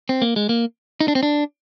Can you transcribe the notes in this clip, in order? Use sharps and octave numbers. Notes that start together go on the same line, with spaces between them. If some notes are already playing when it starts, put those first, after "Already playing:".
C4
A#3
G#3
A#3
D#4
D4
C4
D4